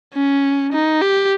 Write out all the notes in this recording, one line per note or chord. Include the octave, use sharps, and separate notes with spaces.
C#4
D#4
G4